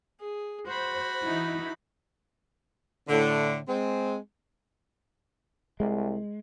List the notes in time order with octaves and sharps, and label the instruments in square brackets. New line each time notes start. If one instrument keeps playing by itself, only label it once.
[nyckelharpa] G#4
[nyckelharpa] F#4 B5 [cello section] C5
[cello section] E3 D#4 E4
[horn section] A2 D3
G#3 C4
[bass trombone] C2 [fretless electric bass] G#3